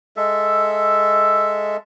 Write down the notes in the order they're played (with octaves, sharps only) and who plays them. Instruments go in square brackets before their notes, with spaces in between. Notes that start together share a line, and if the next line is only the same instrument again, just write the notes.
[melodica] G#3 A4 E5